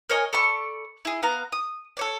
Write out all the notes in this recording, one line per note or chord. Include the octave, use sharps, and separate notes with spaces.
A#4 C#5 D#5 G#5
A4 D5 B5 C#6
E4 G#4
B3 F5 A#5
D#6
A4 C#5 D5